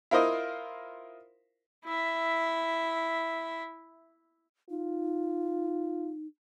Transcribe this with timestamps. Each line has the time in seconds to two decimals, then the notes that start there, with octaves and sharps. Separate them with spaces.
0.11 E4 F4 A#4 C5 D#5
1.85 E4 E5
4.70 D#4 F4